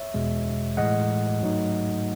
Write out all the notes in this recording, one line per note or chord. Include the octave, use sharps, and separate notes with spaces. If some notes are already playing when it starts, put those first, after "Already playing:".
Already playing: C#5 E5
E2 B2 G#3
A2 E3 G#3 D#5 F#5
G#2 F#3 A3 D#4